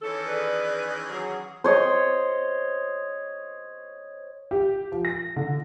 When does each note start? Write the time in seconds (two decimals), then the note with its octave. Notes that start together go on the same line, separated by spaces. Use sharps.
0.02 D#3 E3 C#4 A4 C#5
0.26 G#4 B4 D5
1.09 F#3 G#4 F#5
1.64 C5 C#5 D#5
4.51 G4
4.92 F3
5.05 A#6
5.36 D3